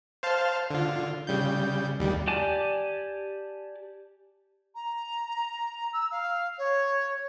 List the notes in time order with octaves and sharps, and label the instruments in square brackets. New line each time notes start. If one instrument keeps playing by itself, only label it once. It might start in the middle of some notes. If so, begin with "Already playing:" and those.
[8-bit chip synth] C5 F5 A5
D3 F4
C#3 G3 G6
D#2 G3
[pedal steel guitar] G4 D5 G#5 A5 D6
[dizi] A#5
E6
F5
C#5